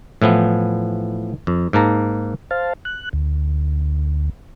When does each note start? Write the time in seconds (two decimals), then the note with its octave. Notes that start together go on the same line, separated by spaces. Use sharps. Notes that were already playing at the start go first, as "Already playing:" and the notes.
0.22 A2 E3 F3 B3
1.47 F2
1.73 G#2 A#3 A5 A#5
2.51 C5 F5 A5
2.85 F#6
3.13 D2